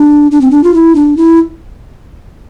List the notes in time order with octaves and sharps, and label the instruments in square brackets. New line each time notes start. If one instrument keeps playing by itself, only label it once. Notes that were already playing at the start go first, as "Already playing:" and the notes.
Already playing: [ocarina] D4
D4
C4
D4
F4
E4
D4
E4